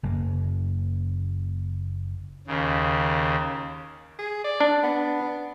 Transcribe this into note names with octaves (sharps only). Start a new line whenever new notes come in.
F#1 F#2 A#3
D#2 C#3
G#4
D5
D4
B3